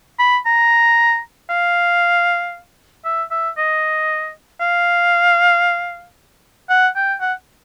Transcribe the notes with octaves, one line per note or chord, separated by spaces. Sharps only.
B5
A#5
F5
E5
E5
D#5
F5
F#5
G5
F#5